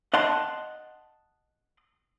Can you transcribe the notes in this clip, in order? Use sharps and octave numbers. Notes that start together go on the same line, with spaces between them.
D#5 F#5 A5 C6